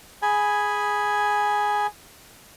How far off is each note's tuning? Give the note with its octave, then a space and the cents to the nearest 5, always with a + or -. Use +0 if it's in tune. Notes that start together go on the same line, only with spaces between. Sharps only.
G#4 +0 G#5 +0 B5 +0